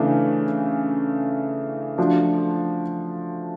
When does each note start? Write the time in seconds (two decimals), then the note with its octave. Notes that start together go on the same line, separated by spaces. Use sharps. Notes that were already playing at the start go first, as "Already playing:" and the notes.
Already playing: C#3 E3 A3 D4
1.98 F3 A3 D4 F#4